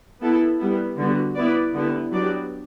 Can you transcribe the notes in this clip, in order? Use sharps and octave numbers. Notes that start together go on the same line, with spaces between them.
B3 E4 A4
G3 B3 E4
D3 G3 B3 F#4
B3 E4 B4 D5
D3 G3 B3 E4
F#3 B3 D4 G4 D5